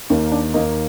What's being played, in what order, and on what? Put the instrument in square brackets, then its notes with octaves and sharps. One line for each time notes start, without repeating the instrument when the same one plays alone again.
[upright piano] D#2 D#3 A#3
D4
D#2 D#3 A#3 D#4